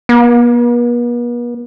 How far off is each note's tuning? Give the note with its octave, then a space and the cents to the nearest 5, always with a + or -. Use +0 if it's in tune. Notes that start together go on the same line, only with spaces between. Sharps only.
B3 -45